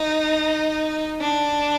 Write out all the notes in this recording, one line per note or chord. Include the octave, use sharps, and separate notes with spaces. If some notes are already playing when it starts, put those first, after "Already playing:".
Already playing: D#4
D4